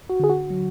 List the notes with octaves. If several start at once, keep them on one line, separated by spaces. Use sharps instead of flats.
F#4
D3 G#4
F#4
F#3